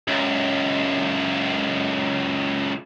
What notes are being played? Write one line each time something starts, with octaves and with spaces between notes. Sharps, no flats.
C#2 F#2